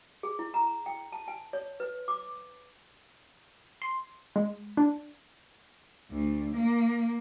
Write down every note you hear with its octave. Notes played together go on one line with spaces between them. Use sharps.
G#4
E4
A#5
G5
A5
G#5
C#5
B4
D6
C6
G#3
D4
D2
A#3